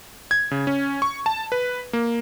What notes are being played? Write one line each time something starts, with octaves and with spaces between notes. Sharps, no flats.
G#6
C#3
C#4
C#6
A5
B4
A#3